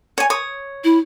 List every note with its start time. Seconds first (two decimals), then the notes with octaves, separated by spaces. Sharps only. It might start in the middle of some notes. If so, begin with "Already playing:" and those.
0.18 C#5 G#5
0.30 C#5 D#6
0.84 E4